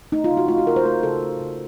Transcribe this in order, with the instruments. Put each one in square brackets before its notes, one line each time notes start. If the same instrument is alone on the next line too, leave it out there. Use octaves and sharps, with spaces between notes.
[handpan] A3 D#4
F4
C#3
F#4
A3 F4
F#4
C#3 A#4
C5
A3 A#4
C#3 A4
A3
C#3